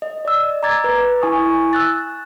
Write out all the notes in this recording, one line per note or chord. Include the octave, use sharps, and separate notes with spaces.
D#5
D5 E6
A#5 D6 G#6 A6
B4
E4 G#5 C#6 D#6
E6 F#6 A6